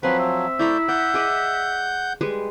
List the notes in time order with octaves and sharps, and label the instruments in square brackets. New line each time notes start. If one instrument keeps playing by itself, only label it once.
[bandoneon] F3 F#3 [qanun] C4 C6 [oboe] B4
[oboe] E5
[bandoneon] A3 D5 G6 [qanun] E4 A#5 B5
[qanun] D5 [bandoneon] F#5 G6
[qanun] G#4 D5 D#5
G3 G#3 B4